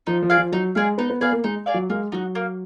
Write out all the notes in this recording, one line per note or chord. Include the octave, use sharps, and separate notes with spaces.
F3 D#4
F3
G#4 D5 F5
F3
F#3 D#4
G#3 G#4 D5 F5
B3 D#4
B3
B3 G#4 D5 F5
A#3
G#3 D#4
G#4 D5 F5
F#3
G#3 A#3
F#3 D#4 F#4
A#3